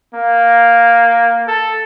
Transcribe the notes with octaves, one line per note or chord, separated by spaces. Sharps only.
A#3
A4